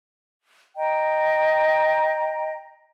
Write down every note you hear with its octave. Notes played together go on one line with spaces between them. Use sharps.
D#5 G5 A#5